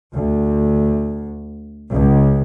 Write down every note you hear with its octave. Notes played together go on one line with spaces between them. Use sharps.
D2
C#2